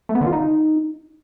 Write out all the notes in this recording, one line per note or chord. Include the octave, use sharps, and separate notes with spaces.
A3
B3
D3
F4
D#4